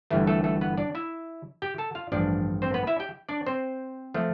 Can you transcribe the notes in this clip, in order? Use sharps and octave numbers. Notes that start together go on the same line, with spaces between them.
G1 G2 E3 A3 E4
A3 A4
A3 A4
B3 B4
D4 D5
E4 E5
G4 G5
A4 A5
F4 F5
A1 G2 F3 D4 D5
C4 C5
B3 B4
E4 E5
G4 G5
D4 D5
C4 C5
F3 A3